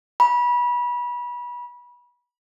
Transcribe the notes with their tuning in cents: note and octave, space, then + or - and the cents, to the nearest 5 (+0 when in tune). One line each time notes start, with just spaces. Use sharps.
B5 -25